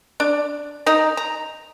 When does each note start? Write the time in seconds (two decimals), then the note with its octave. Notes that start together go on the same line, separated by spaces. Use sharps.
0.20 D4
0.86 D#4 A#5
1.17 A#5